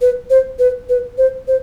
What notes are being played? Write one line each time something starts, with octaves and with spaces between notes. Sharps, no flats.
B4
C5
B4
B4
C5
C5